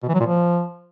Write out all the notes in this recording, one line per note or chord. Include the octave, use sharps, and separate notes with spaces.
B2
E3
F#3
A#2
F3